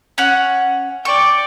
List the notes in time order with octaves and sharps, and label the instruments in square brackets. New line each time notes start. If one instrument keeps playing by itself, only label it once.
[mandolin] C#4 F#5
[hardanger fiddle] D5 G5 [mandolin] C#6